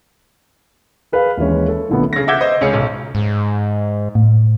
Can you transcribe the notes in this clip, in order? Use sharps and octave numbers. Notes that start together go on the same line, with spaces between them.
G#4 B4 F5
D#2 E3 G#3 C#4
A4
B1 A#2 D3 A3 B3
C#3 A#6
E5 F#5 D6 E6 G6 G#6
C5 D#5
C#2 C#4 G#4 C#7
B1
G#2
A2